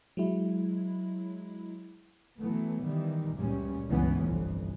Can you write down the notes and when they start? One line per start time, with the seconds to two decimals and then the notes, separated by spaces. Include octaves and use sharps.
0.17 F#3 G#3 E4
2.39 E3 F#3 A3 B3
2.83 D#3 E3 G3
3.34 C#2 F#2 A#2 G3 C#4
3.89 C#2 G2 E3 B3 C#4
4.22 G1 C2 F2 E3